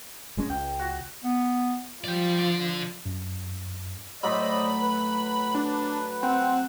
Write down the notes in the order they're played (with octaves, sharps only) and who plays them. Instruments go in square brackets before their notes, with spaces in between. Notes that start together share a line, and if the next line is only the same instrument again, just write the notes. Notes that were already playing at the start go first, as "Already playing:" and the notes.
[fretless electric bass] F#1 G#3 C#4
[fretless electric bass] C#2 [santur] G5
[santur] F#4
[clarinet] B3
[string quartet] F3 [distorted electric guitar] D5 G5
[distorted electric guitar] D3 D5
[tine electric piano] F#2
[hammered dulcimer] A2 F#3 [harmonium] C5 D5 D#5 [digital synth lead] B5
[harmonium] B4
[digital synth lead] D4
[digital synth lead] C4 [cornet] F#5